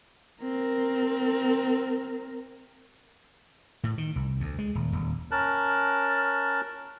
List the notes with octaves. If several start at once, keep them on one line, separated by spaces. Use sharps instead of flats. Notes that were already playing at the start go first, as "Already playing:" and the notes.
C4 A#4
A2
D#3
C2
D2
G#3
D#1
D#1
C#4 A#4 A5 F#6